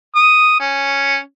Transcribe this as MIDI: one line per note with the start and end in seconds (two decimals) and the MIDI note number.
0.16 0.55 87
0.60 1.19 61